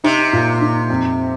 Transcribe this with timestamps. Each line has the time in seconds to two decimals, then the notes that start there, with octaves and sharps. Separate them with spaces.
0.04 C3 D#4
0.33 A#2
0.61 D#4
0.90 F2